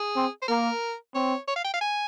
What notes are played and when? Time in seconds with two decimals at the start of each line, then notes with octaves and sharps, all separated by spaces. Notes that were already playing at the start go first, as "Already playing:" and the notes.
Already playing: G#4
0.16 C4
0.42 C5
0.48 A#3 A#4
1.15 C4 C#5
1.48 C#5
1.56 F5
1.65 G5
1.74 F5
1.81 G#5